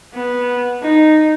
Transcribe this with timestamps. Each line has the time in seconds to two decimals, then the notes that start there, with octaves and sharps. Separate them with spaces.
0.13 B3
0.82 D#4